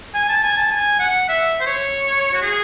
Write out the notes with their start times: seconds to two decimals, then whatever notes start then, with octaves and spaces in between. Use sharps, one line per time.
0.14 G#5
0.29 A5
0.43 G#5
0.57 A5
0.71 G#5
1.00 F#5
1.28 E5
1.60 C5
1.66 C#5
2.33 F#4
2.42 G#4